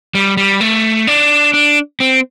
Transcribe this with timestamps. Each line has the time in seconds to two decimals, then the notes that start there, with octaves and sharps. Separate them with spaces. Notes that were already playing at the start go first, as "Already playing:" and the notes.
0.15 G3
0.37 G3
0.61 A3
1.07 D4
1.53 D4
2.00 C4